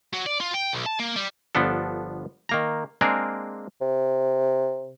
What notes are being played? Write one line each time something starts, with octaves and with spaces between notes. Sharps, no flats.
F#3
D5
F4
G5
B1
A5
A#3
G3
G1 F3 B3 D4 A4
D#3 A#3 A#5
G#3 A#3 C4 D4 G#4 A#4
C3